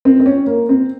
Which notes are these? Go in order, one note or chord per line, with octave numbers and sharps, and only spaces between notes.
C4
C4
C#4
A#3
C4